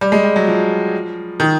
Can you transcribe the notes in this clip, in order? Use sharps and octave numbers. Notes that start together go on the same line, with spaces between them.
G3
G#3
G3
F#3
F3
D#3